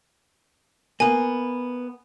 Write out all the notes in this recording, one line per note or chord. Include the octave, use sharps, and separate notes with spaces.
A#3 B3 G#5